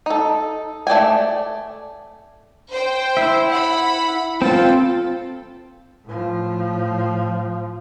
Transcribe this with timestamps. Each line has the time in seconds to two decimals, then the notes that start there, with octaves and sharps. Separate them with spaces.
0.06 D#4 A4
0.87 A3 D5 G5 G#5
2.70 C5 G5
3.17 E4 E5
3.48 F#5 B5
4.42 C4 F4 A4
6.05 A2 F3